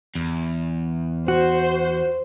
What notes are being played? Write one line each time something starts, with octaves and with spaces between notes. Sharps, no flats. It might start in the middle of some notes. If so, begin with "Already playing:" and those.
E2
F#4 C5